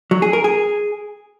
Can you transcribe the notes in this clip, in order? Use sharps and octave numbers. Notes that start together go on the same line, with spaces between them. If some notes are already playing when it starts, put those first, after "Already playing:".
F#3
G#4
A#4
G#4